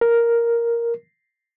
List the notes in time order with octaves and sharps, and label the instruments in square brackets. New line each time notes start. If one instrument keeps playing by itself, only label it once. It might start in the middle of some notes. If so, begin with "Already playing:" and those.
[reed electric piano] A#4